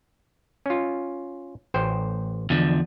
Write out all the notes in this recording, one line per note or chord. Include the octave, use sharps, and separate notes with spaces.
C#4 F4
A1 C5 G5
E2 D3 F3